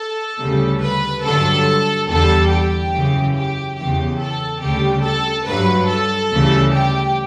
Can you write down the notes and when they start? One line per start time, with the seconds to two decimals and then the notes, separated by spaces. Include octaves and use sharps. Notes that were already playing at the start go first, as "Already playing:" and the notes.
Already playing: A4
0.40 D2 C#3 G3
0.83 B4
1.25 G2 D3 F#3 A4
2.09 E2 D3 G3 A4
2.51 G4
2.93 F#2 C#3 E3
3.35 G4
3.78 E2 C#3 E3 G4
4.20 A4
4.62 D2 C#3 G3 G4
5.04 A4
5.46 G2 F#3 B4
5.89 A4
6.31 D2 C#3 E3 G3
6.73 G4